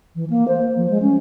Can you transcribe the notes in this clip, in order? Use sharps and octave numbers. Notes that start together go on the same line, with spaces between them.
E3
A#3
C5
F3
G#3
C#4